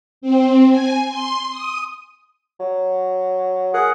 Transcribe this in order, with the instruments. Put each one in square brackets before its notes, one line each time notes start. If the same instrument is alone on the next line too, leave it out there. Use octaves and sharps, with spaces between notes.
[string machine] C4
G#5
C6
D#6
[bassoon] F#3
[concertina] G#4 F#5 [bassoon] A#4